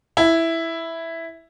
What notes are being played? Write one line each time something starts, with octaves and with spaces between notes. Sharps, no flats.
E4